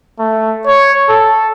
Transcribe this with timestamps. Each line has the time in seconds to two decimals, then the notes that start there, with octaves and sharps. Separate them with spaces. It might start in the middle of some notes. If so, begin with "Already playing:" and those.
0.19 A3
0.67 C#5
1.09 A4